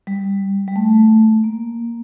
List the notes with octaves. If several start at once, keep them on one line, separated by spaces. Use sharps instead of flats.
G3
G3
A3
A#3